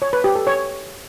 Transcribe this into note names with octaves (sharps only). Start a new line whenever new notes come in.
C#5
B4
G4
A4
C#5